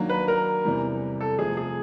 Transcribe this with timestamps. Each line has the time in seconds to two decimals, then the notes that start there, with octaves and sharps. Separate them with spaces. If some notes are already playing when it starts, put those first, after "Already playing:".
Already playing: D#3 F#3 A#3 D4
0.09 B4
0.28 A#4
0.65 E2 C3 E3 G3
1.21 A4
1.39 C3 F3 A3 G#4
1.57 G#4